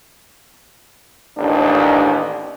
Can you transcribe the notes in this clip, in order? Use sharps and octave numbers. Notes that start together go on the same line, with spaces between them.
A1 D#2 D4